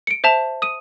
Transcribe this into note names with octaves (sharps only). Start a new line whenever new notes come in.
C#7 D7
C5 E5 A5 F7
D#6 D#7